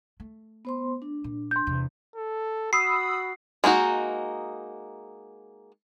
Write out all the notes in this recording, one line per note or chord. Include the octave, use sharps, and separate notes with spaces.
A3
B3 C5 C6
D4
A#2
C6 G6
E2 C3
A4
F#4 B5 D#6 E6 C7
G#3 A#3 D#4 F#4